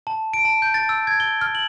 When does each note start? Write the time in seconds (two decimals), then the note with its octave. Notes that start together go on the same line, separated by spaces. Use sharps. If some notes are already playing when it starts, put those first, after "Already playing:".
0.07 A5
0.33 D7
0.45 A5
0.62 G6
0.74 A6
0.89 E6
1.07 G#6
1.20 G7
1.41 F6
1.55 F#7